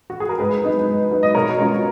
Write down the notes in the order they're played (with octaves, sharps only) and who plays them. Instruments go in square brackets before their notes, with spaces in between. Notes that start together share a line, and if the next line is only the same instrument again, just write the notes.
[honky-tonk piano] F#4
G#4
A#4
G#2 G#4 B4
F#3 B3 D#4
G#2
F#3 B3 D#4
D#5
B2 A#4 C#5
G#3 C#4 F4